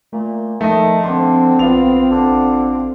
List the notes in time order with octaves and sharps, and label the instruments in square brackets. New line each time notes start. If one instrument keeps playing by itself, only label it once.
[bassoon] A#2 [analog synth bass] A3
[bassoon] D#3 [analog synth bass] F3 [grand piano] A3 D#5
[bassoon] D3 [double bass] C4 [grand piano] C6
[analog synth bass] A#1 [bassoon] B3 [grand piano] F4 F7
[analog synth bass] A1 [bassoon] D3